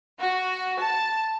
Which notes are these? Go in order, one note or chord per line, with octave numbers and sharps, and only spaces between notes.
F#4
A5